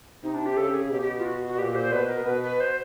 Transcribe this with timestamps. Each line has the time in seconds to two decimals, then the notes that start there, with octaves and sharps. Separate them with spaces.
0.24 C3 D#4
0.34 D4
0.46 G4
0.57 C#3 A4
0.68 G4
0.74 G#4
0.91 B2 G4
1.02 G4
1.19 F4
1.25 F#4
1.48 F#4
1.58 A#2 G4
1.75 C5
1.92 B2 B4
2.09 A#4
2.26 B2 B4
2.43 B4
2.60 C5